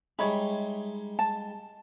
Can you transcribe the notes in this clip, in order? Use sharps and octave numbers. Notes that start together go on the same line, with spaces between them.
G3 G#3 D#4 C#5 E5 B5
A5